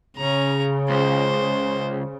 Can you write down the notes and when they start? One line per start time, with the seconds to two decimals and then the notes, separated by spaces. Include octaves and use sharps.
0.17 C#3 C#4 A#5
0.90 C#2 C5